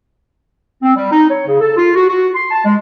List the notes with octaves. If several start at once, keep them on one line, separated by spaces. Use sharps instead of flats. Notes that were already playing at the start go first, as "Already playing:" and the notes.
C4
G3
D#4
C#5
C#3
A4
F4
F#4
F#4
C6
A5
G#3